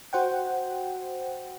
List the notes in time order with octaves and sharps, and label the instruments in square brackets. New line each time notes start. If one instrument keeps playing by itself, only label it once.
[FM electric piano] F#4 C5 F#5 G5